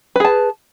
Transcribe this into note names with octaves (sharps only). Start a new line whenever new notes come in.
G#4 B4 A5